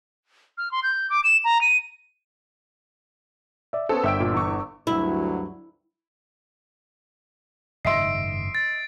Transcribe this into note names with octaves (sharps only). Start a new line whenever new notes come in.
F6
C6
G6
D6
E7
A#5
D#7
D5 E5
B3 C#4 A4 C5
G1 E5 G5 E6 D7
A#2
E2 C#6
D2 G2 F#3 E4
F#1 G#2 D#3 D#5 E5 C6 C7 D7
A6